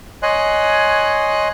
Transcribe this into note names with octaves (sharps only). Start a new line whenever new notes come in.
C#5 D#5 G#5 C6 F#6